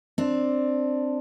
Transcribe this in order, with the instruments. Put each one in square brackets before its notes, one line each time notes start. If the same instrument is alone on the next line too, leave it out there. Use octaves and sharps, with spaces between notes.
[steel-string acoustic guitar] C4 D4